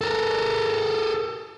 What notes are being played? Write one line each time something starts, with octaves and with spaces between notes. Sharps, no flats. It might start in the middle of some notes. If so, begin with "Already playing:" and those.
A4 A#4